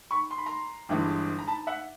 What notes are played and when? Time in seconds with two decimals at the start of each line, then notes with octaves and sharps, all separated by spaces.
0.11 B5 C#6
0.31 C6
0.38 B5
0.46 A#5 C6
0.89 G1 G2 E3 G#3
1.39 A#5
1.47 A5 B5
1.67 E5 F#5